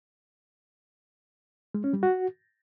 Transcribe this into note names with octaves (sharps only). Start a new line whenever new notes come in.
G#3
C#4
G3
F#4